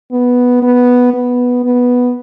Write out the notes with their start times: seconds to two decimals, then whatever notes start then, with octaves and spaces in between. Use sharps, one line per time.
0.12 B3
0.63 B3
1.14 B3
1.64 B3